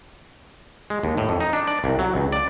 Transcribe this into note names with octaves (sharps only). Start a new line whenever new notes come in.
G#3
D#2
A2
F2
D#4
D4
D5
C2
F#3
C#2
D5